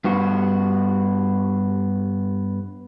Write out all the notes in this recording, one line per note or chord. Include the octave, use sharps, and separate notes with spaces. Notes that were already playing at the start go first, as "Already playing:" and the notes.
G2 B3 F#4